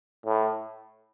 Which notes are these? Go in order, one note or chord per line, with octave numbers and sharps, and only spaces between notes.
A2